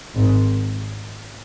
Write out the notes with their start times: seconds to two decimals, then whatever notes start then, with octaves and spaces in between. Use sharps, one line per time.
0.16 G#1 G#2